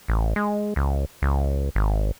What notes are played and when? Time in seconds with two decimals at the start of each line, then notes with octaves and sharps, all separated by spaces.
0.08 A1
0.36 G#3
0.76 C#2
1.22 C#2
1.75 G#1